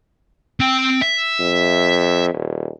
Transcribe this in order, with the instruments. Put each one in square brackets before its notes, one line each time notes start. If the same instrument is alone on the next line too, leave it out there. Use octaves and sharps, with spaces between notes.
[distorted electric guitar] C4 G5
E5
[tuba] F2
D#1